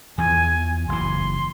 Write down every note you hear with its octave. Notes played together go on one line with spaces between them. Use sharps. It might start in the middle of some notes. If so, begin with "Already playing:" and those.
E2 E3 F3 G#5
F#1 E3 C6